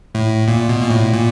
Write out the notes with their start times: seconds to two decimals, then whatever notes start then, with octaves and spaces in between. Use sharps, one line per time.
0.15 A2
0.48 A#2
0.69 B2
0.82 A#2
0.90 A2
1.13 A#2